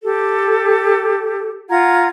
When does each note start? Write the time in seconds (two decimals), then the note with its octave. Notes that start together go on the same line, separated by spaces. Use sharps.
0.02 G4 A4
1.69 F4 F#5 A#5 G#6